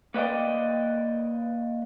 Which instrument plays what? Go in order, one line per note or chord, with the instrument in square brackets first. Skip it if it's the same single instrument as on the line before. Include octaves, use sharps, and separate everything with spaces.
[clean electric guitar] A#3 B4 D5 D#5 G5